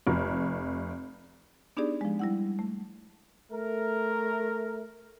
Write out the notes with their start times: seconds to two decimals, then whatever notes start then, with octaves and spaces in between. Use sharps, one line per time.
0.07 F1
1.77 B3 D4 D#4 G4 G#4 D5
2.01 F3 G#3
2.19 G3 E4 F#5
2.59 A3
3.52 A3 A#4